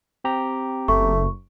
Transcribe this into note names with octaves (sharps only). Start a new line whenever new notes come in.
C4 G4 A#5
F#1 A3 C#6